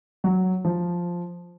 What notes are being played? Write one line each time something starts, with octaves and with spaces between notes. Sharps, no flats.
F#3
F3